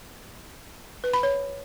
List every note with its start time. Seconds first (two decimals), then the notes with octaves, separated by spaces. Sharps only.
1.04 B4
1.13 B5
1.23 C#5